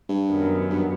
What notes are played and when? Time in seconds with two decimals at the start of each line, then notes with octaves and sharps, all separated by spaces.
0.09 G2
0.29 F#2 D#3 F#3 B3
0.70 G2